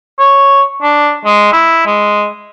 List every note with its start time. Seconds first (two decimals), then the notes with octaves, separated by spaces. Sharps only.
0.19 C#5
0.82 D4
1.25 G#3
1.53 E4
1.86 G#3